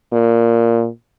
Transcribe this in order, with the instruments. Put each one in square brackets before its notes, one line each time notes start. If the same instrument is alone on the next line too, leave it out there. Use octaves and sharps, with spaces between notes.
[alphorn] A#2